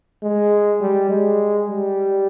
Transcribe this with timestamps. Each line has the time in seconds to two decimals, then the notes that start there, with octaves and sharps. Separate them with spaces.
0.23 G#3
0.81 G3
1.10 G#3
1.68 G3